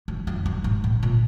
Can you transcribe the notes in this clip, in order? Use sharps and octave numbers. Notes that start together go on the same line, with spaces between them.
F#2
F2
F#2
G#2
A2
A#2